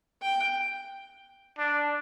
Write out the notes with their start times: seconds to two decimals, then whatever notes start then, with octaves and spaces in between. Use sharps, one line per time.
0.22 G5
1.58 D4